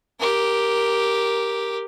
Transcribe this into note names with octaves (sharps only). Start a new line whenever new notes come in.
G4 A#4